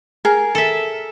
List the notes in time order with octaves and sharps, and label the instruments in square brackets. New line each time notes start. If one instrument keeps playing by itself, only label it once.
[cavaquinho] G#4 A#4
[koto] A4 E5